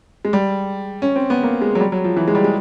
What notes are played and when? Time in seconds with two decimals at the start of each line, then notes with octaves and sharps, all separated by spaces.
0.25 G#3
0.33 G3
1.02 C#4
1.16 C4
1.30 B3
1.43 A#3
1.62 G#3
1.75 F#3
1.80 G3
1.92 F#3
2.04 F3
2.17 E3
2.28 G#3
2.35 G3
2.44 G#3